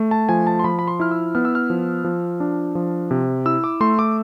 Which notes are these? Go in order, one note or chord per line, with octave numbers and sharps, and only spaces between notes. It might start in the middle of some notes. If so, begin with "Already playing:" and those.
Already playing: A3
A5
F3 G#5
A5
C6
F3 B5
B5
C6
E4 F6
E6
B3 F6
E6
F6
F3
F3
D4
F3
C3
E4 E6
D6
A3 C6
D6